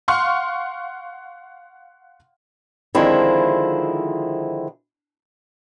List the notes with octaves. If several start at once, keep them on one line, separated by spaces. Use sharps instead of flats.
F5 F#5 C6 C#6 F6 F#6
D3 D#3 F3 G#3 C4 E4